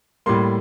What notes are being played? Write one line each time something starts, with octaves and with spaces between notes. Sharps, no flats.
A2 G3 A#3 C6